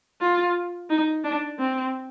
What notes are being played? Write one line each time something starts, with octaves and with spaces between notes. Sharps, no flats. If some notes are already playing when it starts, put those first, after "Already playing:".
F4
D#4
D4
C4